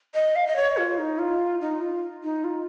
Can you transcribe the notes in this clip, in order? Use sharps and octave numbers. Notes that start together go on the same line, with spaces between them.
D#5
F5
D#5
C#5
F4
D#4
F4
D#4
F4
D#4
F4